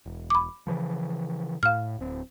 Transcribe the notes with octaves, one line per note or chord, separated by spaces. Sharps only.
E1
B5 D6
C#3 E3 F3
A2 F5 F6
D1 C4